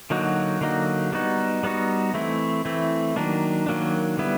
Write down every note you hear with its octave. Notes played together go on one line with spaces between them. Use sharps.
D3 F#3 A#3 D#4 F#4
D3 F#3 A#3 D#4 F#4
G3 B3 D#4 F#4
G3 B3 D#4 F#4
E3 A3 C4 E4
E3 A3 C4 E4
D#3 F#3 A#3 D4
D#3 F#3 A#3 D4
D3 G3 B3 E4